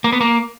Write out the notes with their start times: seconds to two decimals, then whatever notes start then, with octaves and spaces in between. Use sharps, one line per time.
0.04 A#3
0.12 B3
0.21 A#3